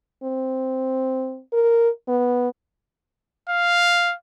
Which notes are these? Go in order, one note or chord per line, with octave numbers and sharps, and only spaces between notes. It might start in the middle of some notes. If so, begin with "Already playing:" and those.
C4
A#4
B3
F5